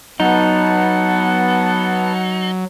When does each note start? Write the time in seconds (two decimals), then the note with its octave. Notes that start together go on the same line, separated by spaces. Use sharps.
0.20 F#3 B3 D#4 F#5 A5